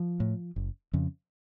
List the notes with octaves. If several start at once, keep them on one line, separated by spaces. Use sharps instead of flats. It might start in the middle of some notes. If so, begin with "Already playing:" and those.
Already playing: F3
A2
F#1
F2 C#3